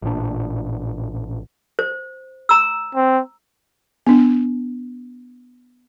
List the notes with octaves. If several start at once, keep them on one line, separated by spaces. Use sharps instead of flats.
A1 A#2 D4
C5
A#5 E6
C4
B3 D4